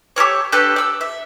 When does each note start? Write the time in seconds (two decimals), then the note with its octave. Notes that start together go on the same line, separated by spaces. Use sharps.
0.16 G4 A4 A#4 C#5
0.52 D4 G4 A4 B4
0.76 D5 E6
1.01 E5